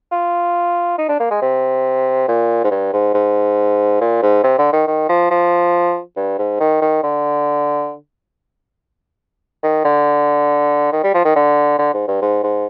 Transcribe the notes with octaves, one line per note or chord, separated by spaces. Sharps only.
F4
D#4
D4
A#3
G#3
C3
A#2
G#2
G2
G#2
G#2
A#2
G#2
C3
D3
D#3
D#3
F3
F3
G2
G#2
D#3
D#3
D3
D#3
D3
D#3
G3
F3
D#3
D3
D3
G#2
G2
G#2
G#2